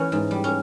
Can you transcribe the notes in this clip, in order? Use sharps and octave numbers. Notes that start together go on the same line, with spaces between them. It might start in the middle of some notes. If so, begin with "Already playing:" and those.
Already playing: E3 C#4
G#2
G3
C#4